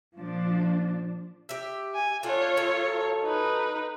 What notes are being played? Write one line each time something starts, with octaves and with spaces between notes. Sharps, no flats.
A#2 F3 D4
G4 E5
G#5
D4 F4 A4 C#5 F#5
D#3 F#3 A4
D#4 B4